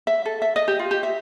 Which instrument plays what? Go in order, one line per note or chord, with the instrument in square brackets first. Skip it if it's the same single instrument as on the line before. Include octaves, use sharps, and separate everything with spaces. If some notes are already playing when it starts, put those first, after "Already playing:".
[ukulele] E5
A4
E5
D#5
G4
F4
G4
E5